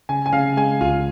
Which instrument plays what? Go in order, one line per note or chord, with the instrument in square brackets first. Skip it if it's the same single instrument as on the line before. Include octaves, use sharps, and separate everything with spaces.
[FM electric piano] C#3 [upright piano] G#5
[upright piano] G#5
[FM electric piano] C#3 [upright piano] F5
[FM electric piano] G#3 [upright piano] G#5
[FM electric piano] C#2 [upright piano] F4